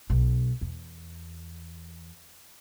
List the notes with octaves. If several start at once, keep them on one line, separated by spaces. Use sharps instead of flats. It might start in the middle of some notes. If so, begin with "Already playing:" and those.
B1
E2